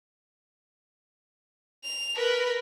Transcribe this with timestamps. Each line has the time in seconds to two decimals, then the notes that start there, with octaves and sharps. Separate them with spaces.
1.84 F7
2.15 A#4 B4